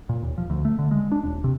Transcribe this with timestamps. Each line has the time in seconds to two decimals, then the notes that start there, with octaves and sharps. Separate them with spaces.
0.09 A#2
0.23 D#2
0.38 F3
0.50 D2
0.65 A3
0.79 D3
0.91 G#3
1.12 D4
1.23 D#1
1.44 C3